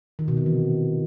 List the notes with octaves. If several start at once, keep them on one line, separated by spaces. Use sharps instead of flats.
D#3
B2
C3
E3